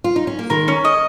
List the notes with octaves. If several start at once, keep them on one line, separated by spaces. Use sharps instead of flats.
F4
D#4
C#4
A#3
D#3 G#3 A#4
C#4
D#5